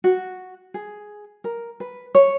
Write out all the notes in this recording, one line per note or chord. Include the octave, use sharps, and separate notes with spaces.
F#4
G#4
A#4
B4
C#5